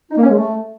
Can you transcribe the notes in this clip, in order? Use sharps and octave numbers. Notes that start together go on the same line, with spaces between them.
D#4
A#3
C#4
G#3
A3